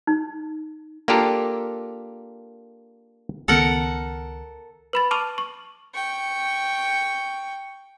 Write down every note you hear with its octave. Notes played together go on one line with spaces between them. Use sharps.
D#4
A#3 D4 F4 G4 A4 A#4
C#2 D#3 B3 A4 A#4 F#5
B4 B5 A6
A5 C#6 D6 F6 D#7 F7
C#6
G5 C#6